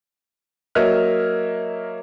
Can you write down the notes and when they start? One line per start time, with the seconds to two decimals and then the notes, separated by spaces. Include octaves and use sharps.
0.75 F#3 A#3 C#5 D#5 E5 F6